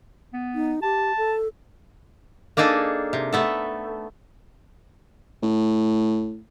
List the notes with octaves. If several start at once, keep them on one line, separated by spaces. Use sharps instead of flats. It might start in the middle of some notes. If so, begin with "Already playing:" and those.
B3
D#4
G4 A5
A4
A#3 D4 D#4 G#4 A4
C3
A3 B3 A4
A2